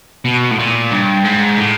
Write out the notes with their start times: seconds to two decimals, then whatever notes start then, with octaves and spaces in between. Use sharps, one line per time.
0.25 B2
0.51 A2
0.59 A#2
0.92 G2
1.25 G#2
1.58 A2